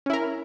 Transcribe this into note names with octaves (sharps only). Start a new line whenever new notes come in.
C#4 E4 A#4